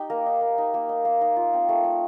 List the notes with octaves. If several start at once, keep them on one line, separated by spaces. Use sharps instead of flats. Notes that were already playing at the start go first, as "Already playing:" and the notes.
Already playing: D#4 G4
A#3 A#4
D#4
A#3
D#4
A#3
D#4
A#3
D#4
F4
C4
A3
A3